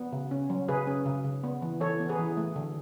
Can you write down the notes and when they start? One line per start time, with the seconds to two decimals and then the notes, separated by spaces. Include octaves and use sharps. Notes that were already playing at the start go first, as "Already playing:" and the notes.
Already playing: B3
0.12 C#3
0.31 C#4
0.50 F#3
0.68 C#3 G#4 B4
0.87 C#4
1.06 C#3
1.25 C#3
1.43 B3
1.62 E3
1.81 E3 A4 C#5
2.00 B3
2.09 G#4 B4
2.18 E3
2.37 A3
2.56 D3